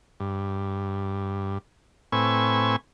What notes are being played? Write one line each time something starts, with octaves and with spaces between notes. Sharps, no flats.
G2
A2 C4 B4 G#5 C#6 E6